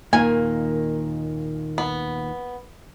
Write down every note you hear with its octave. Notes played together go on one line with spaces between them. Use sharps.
D#2 A#2 D#3 A#3 G#5
B3